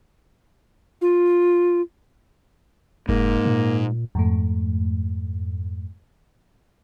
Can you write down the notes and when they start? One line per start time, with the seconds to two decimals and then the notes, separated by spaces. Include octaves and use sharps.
1.01 F4
3.09 F1 G#2 A#3
3.45 A#2
4.15 F2 G#2 A3